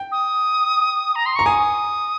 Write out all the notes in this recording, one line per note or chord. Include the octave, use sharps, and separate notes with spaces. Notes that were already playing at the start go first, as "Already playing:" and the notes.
Already playing: G5
D#6
A#5
C6
A#5 C#6
G#5 D#6